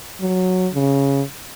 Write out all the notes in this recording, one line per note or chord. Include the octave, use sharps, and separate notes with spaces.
F#3
C#3